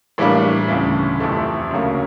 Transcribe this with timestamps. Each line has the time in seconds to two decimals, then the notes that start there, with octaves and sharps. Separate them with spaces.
0.18 A2 E3 G3 A#3 D4
0.68 D2 C#3 E3
1.20 F2 C3 E3 A3
1.71 D2 C#3 F#3 A#3